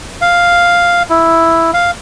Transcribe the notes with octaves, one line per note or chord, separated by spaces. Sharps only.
F5
E4
F5